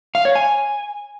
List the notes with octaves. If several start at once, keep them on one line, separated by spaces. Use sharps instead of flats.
F5
C#5
G#5